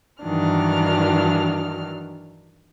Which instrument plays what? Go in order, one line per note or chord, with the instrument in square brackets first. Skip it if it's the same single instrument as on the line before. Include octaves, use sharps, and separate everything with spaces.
[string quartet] G2 D#3 E3 F#3 D4 F6